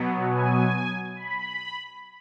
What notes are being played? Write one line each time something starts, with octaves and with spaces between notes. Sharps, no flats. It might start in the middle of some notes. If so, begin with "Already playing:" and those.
Already playing: B2 F#3 B3
G#5
B5